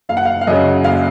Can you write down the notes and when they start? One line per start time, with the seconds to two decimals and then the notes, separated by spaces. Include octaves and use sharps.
0.09 F#1 F5
0.17 F#5
0.25 F5
0.41 F5
0.47 F#2 C#3 D#5
0.84 F#1 F5